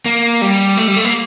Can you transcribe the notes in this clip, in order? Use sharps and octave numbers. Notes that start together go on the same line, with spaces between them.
A#3
G3
A3
G3
A3
A#3